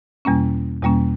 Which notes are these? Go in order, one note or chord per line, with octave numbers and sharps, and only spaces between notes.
E2 B2 G3 A#3 C#4
E2 B2 G3 A#3 C#4